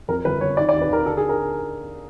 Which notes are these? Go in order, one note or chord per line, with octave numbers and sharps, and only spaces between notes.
F2 A#4
G1 B4
G1 C#5
D#3 D5
D5
D#2
B4
D#2 A#4
D3 A4
G#4
A#4